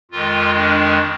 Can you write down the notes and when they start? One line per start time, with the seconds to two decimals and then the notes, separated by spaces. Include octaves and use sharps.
0.11 F2 D#3 G#3 F4
0.55 D4